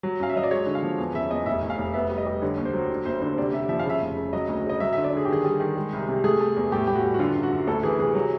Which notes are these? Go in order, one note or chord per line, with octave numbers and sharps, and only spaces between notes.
F#3
F#2 F5
E5
F#3 D#5
D5
G#3 C#5
D3
F5
F3
E2
C#3 E5
E2 D#5
F1 E5
F1
F5
F1
B3 E5
G3
D#5
G3
D3 C#5
D#2
C5
F#3
D3
F#1 C5
D3 C5
C3 D5
C3 E5
F3 E5
F5
C#3 E5
F1
C#3
F#3 D#5
D2
C#3 D#5
F#3 E5
D3 E5
D5
D3 G#4
G4
D#3 G#4
G3
D#3
G#3
C2
C3
A3 G#4
A3
E2
A2 G4
A2 G4
F#4
G3
F#4
D3 F4
F#2
F#4
F#2
D2 A4
E3 G#4
C3 G#4
F#3